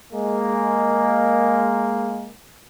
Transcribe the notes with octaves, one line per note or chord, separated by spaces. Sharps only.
G#3 A#3